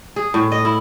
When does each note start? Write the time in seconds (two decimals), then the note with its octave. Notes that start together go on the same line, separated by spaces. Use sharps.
0.16 G#4
0.34 A2
0.52 D#5
0.65 E4